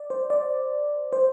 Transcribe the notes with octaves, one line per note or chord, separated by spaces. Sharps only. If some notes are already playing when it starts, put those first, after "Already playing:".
Already playing: D5
C5
D5
C5